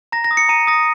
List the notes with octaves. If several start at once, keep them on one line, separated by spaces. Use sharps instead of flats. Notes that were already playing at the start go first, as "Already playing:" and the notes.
A#5 A#6
A#6
D#6
C#7
A#5 D#7
D#6 A#6